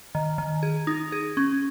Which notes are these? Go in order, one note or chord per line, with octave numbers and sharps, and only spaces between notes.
D#3
D#3
G#4
D#4
G#4
C#4